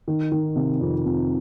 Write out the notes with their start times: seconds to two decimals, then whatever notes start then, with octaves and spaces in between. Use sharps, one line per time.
0.08 D#3
0.32 D#3
0.56 C3
0.81 F2
1.05 F2